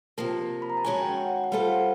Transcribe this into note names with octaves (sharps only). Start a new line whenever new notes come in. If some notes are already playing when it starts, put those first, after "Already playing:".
C3 F3 A#3 A5
B5
A#5
A5
D#3 G#3 C#4 F#4 G#5
G5
F#5
F#5
G3 C4 F4 A4 C5 F5
F#5
F5